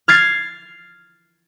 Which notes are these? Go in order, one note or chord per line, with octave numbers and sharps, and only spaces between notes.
F6 G#6 A6 C7